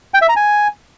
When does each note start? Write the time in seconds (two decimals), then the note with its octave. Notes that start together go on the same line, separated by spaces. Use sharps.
0.14 G5
0.22 E5
0.29 A#5
0.36 G#5